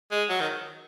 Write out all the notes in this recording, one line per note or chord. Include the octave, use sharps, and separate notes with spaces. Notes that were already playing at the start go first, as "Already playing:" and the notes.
G#3
F#3
D#3